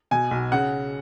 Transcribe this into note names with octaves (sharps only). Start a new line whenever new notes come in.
B2 G#5
B1
C#3 F#5